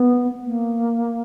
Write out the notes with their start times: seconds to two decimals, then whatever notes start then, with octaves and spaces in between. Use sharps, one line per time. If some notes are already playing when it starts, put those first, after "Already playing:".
Already playing: B3
0.47 A#3